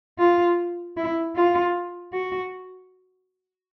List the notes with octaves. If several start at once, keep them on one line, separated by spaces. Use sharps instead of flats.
F4
E4
F4
F#4